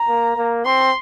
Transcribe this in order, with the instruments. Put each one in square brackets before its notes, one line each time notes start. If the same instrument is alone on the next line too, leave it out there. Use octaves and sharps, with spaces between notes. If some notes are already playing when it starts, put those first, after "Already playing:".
Already playing: [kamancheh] A#5
[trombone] A#3
A#3
[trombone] C4 [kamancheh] C6